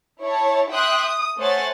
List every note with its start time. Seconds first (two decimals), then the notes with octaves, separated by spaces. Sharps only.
0.22 E4 C#5 A5
0.71 E5 G5 C6 D#6 F#6
1.02 D#6
1.38 A3 C5 C#5 F#5 G#5 A6